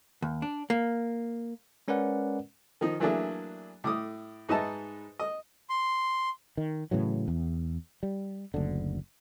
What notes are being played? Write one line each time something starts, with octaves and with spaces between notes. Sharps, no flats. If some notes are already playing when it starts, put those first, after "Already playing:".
D#2
D4
A#3
G#3 C#4 A#4 B4 D5 F#5
D#3 F3 D#4
E3 F#3 A3 A#3 D4 G#4
A2 D6 D#6
G#2 D#4 B4 D#5 E5 A5
D#5
C6
D#3
A2 C#3 E3 F#3
E2
G3
F#1 D2 D3